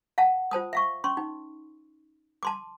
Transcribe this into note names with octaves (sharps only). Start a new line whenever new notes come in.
F5 F#5 A5
F4 C5 A5 D#6
E5 F5 C#6
C#4 C6 C#6
D#4
A5 C6 D6